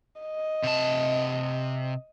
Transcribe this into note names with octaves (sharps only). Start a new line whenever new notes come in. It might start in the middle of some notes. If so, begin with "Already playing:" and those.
D#5
C3 A5